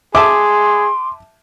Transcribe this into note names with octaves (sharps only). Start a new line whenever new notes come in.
G#4 E5 G#5 A5 C6 D6